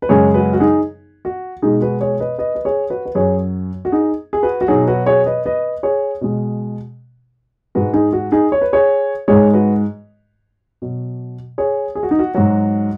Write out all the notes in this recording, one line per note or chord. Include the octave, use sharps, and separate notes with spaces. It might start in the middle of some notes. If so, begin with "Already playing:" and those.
B4
F#2 C#3 G#3 G#4 C#5
F#4 B4
F#4
D#4 G#4
F#4
B2 G#3 D#4 G#4
F#4 B4
G#4 C#5
B4 D#5
B4 D#5
B4
G#4 C#5
F#4 B4
B4
F#2 F#3 G#4 C#5
F#4
D#4 G#4
G#4
F#4 B4
F#4
B2 F#3 D#4 G#4
F#4 B4
G#4 C#5
B4 D#5
B4 D#5
G#4 C#5
B2 G#3
G#2 G#3 F#4 B4
D#4 G#4
F#4
D#4 G#4
C#5
B4
G#4 C#5
G#2 G#3 G#4 C#5
F#4 B4
B2 F#3
G#4 C#5
G#4
F#4
D#4
F#4
G#2 F#3 F#4